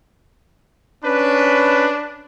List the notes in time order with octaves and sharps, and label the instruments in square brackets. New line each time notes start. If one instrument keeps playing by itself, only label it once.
[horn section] C#4 B4 [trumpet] D4